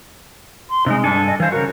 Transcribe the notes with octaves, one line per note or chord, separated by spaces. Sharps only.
C6
C3 G#3 D#4
G2 D4 A4 G#5
D#5
E3 C5 F5
C#3 F#4 A#4